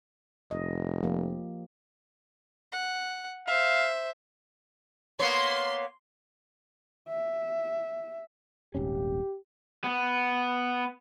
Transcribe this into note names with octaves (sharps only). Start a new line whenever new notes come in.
F1 D#5
F3 A#3 G4
F#5
C5 E5 F5
A#3 B3 C#5 C6
E5
D#1 G#1 C#4 G4
B3